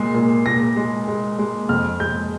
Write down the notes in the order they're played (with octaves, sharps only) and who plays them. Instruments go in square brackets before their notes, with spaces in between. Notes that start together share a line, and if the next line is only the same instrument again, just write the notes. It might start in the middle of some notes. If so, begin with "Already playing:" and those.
Already playing: [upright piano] A#2 G#3 C7
A#2
A#2 A#6
G#3
G#3
G#3
F2 F6
G#3 G6